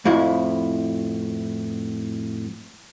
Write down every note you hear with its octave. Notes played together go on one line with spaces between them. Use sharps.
F2 A2 F3 E4